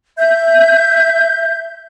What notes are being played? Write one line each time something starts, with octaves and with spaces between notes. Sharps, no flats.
E5 G6